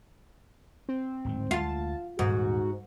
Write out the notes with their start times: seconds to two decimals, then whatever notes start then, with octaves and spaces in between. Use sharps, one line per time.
0.89 C4
1.25 D1 G#2 D#3
1.51 D2 G#3 A3 F4 A5
2.19 D#1 G#2 F#4